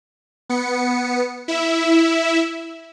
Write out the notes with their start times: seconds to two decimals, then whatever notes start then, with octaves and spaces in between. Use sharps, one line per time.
0.49 B3 C#7
1.48 E4 E5